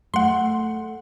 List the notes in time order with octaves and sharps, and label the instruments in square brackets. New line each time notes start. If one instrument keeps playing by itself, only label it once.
[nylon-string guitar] A3 [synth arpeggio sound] F#5 C6